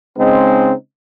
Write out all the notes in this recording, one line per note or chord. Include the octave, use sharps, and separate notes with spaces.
C#3 G#3 C4 D#4